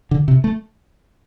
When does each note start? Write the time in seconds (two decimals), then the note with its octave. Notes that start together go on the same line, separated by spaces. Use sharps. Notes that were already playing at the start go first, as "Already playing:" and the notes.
0.11 D3
0.28 C3
0.44 A3